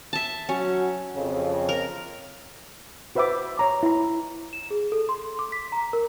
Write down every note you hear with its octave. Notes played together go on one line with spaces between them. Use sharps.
E5 A5
F#3 C#4 F#4
F2 C#3
A#4
F#4 B4 C5 E5 B5 D6
C#5 A#5 D6
E4 A#5
E7
G#4
A4
C6
D6
B6
A#5
A#4